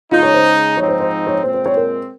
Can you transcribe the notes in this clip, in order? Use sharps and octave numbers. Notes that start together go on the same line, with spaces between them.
C#3 G#3 D#4 F4
C#5
C5
G#2 F3 C4 D#4 C#5
C5
C5
C#5
A#2 G#3 C4 C5
C5
C#5
A#4